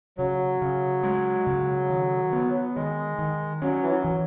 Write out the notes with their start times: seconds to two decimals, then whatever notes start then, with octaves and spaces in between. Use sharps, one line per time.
0.18 C#3 F#3
0.62 C#3
1.03 G#3
1.46 C#3
1.90 D#3
2.33 B3
2.76 D#3 G#3
3.19 D#3
3.62 F#3 C#4
3.82 E3
3.90 F#3
4.04 E3